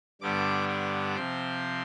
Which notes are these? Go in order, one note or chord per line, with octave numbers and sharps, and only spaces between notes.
G2 D3 G3 B3 D4 D6
D6
C3 F3 C4 C6